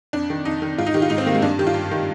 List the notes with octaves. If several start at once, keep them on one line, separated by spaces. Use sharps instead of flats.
F2 D4
D#3
F2 D#4
D#3
G#2 F4
D#4
D#3 G4
F4
G#2 D#4
C4
D#3 A#3
G#3
G2 D4
D#3 G4
F4
G2
D#3